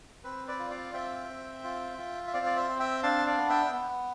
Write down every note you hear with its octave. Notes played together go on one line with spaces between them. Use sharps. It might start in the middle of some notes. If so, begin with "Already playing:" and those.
C4 B4
B4 D5
F4
D5 F5
C4 E5 G5
C4
F4
F4
E5
C4 D5 F5
D5
C5 E5
C4
E5 G5
D4 F5 A5
D5 F5
B3
E5 G5
B3